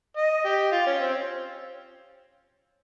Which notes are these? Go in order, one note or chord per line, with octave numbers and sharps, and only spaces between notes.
D#5
G4
F4
C#4
C4